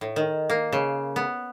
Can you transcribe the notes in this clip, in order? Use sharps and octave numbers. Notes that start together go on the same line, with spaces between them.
A2
D#3
A#3
C#3
B3